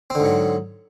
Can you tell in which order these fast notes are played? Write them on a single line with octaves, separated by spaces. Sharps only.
C4 D3 G#2 F#3